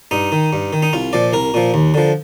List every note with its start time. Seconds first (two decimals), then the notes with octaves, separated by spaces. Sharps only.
0.11 G2 D#4
0.32 D#3
0.53 G2
0.73 D#3
0.82 D#4
0.93 C2 F4
1.13 A#2 F3 D5
1.33 C2 A#4
1.54 A#2 F3
1.74 D#2
1.94 D3 F3